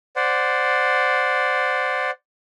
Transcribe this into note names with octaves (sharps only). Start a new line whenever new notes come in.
C5 D5 F#5